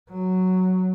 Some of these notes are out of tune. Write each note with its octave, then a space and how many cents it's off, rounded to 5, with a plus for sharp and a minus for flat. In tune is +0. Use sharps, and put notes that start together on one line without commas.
F#3 +0